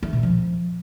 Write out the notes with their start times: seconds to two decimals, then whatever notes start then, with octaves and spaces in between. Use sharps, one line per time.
0.03 A3
0.13 A#2
0.23 F3